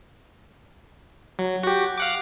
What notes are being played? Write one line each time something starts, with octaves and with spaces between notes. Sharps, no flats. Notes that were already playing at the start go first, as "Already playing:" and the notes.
F#3
F#4 G4
F5 F#5 D6